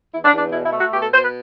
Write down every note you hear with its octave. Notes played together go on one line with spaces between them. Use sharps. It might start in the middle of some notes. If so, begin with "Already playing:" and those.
E2 E4
D4
E2
D4
B2 E4
E4
A3
F#4
B2 G4
A4
B2 C5
B4